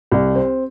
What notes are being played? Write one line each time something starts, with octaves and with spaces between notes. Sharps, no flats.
C2
C4